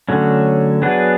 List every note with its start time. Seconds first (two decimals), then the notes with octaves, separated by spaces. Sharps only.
0.09 D3 F#3 A3 C#4
0.82 F#3 B3 D4 G#4 B4